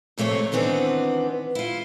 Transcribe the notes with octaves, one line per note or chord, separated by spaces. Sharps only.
F2 C3 A3 A#3 C#5
D#3 E3 B3 C4 D4
E4 F4